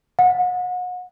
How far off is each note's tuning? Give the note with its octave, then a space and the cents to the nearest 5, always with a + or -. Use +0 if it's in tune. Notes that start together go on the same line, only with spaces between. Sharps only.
F#5 -35